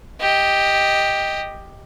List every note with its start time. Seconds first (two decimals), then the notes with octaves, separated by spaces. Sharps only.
0.21 G4 D#5